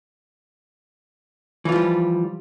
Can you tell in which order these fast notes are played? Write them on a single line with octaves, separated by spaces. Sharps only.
E3 F4 F3 G3